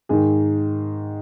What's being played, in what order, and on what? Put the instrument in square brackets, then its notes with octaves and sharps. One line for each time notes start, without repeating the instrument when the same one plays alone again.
[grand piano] G#2 D#3 G#4